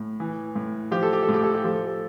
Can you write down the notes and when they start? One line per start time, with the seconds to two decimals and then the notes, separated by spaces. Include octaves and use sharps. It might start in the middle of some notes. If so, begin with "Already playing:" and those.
Already playing: A2
0.20 E3
0.55 A2
0.91 F3 G4
1.03 A4
1.13 G4
1.23 A4
1.29 A2
1.34 G4
1.43 A4
1.54 G4
1.64 F3 A4
1.75 G4
1.86 A4